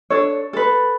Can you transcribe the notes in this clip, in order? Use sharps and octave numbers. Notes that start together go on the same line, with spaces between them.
D4 A4 C#5
A4 B4